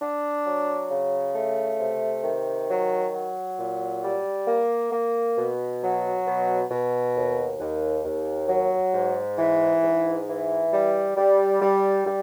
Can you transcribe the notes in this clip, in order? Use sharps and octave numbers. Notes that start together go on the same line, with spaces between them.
D4
F#3
C#3
A3
C3
D#3
F#3
F#3
A#2
G3
A#3
A#3
B2
F#3
B2
B2
D#2
D#2
D#2
F#3
G#2
E3
G#2
E3
G3
G3
G3
G3